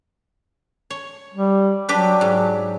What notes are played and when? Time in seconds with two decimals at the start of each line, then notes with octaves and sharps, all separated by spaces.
0.90 C#5
1.34 G3
1.89 F#3 D4 G4 B4
2.21 G#2